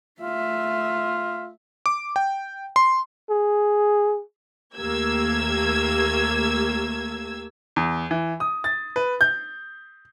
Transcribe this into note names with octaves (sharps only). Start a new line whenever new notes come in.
A3 F4 E5
D6
G5
C6
G#4
D#2 A3 A#3 G4 E6 G#6
E2
E3
D#6
A6
B4
G6